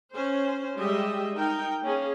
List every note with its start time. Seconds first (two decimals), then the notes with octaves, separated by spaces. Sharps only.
0.14 C#4 C5
0.77 G3 G#3 G4 D#5 E5
1.35 D#4 A#4 G5
1.82 A#3 C#4 G#4